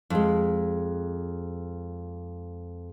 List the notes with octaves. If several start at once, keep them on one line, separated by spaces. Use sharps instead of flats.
F2 G#3